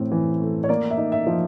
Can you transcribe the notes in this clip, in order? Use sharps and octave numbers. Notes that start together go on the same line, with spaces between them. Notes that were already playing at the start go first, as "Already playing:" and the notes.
Already playing: A2 E3 C4
E3
A3
C#5
A#3 D5
E5
D#4
E5
F3